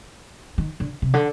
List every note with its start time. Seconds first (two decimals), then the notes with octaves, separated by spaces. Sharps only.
0.58 D#3
0.80 D3
1.02 C3
1.14 D3